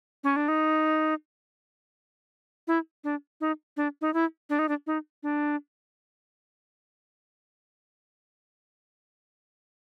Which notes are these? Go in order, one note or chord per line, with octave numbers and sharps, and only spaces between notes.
C#4
D4
D#4
E4
D4
D#4
D4
D#4
E4
D4
D#4
D4
D#4
D4